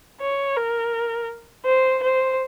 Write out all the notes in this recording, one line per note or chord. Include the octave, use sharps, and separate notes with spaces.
C#5
A#4
C5
C5